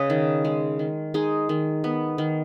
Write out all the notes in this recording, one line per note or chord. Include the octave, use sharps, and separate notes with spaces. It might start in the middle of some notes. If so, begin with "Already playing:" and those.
Already playing: C#3 G#4 B4 C#5 D#5
D#3
G#3
D#3
G#3 D#4 G#4
D#3
B3
D#3